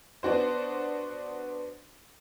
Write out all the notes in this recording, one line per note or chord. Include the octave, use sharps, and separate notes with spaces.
B3 D4 F#4 C5